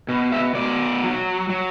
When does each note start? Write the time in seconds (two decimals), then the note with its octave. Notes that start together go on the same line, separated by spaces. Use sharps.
0.09 B2
0.32 E5
0.55 B2 D5
1.03 F#3
1.50 F#3